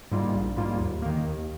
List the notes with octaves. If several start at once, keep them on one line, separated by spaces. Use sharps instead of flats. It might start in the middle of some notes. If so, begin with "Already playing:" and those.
G#2 G3 A#3 F4
A#1
G#2 G3 A#3 F4
D#2
D#3 A#3
D#2